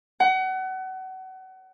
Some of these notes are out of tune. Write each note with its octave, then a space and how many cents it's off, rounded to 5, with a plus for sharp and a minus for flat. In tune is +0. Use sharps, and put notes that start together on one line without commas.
F#5 +30